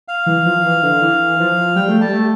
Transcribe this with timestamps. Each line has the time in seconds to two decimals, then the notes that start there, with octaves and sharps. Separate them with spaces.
0.08 F5
0.26 E3
0.46 F3
0.65 E3
0.83 D3
1.02 E3
1.39 F3
1.76 G3 G5
1.88 A3
2.01 G3 A5
2.13 A3